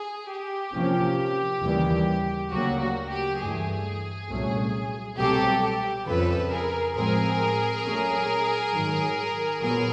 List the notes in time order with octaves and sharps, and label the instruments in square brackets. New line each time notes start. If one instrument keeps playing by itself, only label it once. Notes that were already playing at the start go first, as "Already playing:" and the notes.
Already playing: [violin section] G#4
G4
[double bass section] C3 F3 A#3 C#4
D#2 C#3 E3 G3 A#3
[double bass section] D2 C#3 F#3 A#3 [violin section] F#4
[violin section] F#4
G4
[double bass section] G2 E3 A3 [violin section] G#4
[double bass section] C2 A#2 F#3 A3 C#4
[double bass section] C2 B2 F#3 A3 C4 [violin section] G4 A4
[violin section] G4
[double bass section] F2 C#3 F3 [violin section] A4 B4
[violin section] G#4 A#4
[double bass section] A2 F3 G#3 C4 [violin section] G#4 A#4
[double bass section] A#2 F#3 A3 C#4
G#2 D#3 F#3
[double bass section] A#2 F#3 B3 [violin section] G#4 A#4